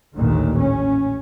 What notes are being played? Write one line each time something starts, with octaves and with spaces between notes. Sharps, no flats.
A1 D#2 A#2 D3 D#3
C#4